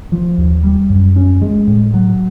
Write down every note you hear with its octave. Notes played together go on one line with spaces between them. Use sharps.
F3
D#2
G3
F#2
C#4
G#3
A2
F#3